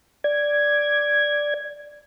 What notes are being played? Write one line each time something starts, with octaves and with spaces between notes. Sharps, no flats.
D5 G#6